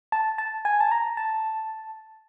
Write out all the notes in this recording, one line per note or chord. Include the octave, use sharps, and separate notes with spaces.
A5
A5
G#5
A5
A#5
A5